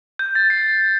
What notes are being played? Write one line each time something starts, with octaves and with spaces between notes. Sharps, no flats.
G6
A6
C7